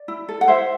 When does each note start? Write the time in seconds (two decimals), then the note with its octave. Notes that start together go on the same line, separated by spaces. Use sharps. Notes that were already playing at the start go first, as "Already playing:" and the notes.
Already playing: D5
0.08 E4
0.29 A4
0.41 F#5
0.48 E4 C5 E5